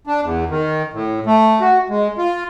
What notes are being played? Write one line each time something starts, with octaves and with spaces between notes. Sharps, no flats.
D4
E2
D#3
A2
A3
F#4
G#3
F4